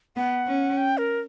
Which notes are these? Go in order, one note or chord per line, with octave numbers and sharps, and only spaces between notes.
B3 F#5
C#4
G5
A#4